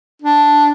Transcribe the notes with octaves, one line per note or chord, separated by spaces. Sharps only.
D4